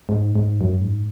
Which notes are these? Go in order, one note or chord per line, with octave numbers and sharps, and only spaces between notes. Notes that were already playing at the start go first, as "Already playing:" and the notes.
G#2
G#2
F#2
G#2